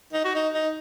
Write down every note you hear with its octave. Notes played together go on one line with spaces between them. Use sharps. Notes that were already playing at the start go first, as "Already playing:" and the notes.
D#4
F#4
D#4
D#4